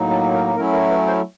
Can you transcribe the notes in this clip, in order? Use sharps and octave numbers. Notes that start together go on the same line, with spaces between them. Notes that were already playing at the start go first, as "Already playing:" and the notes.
Already playing: A2 F#3 A#3 D#4
A4
A#4
F#3 A3 C#4 E4 A#4
A#4
B4
C5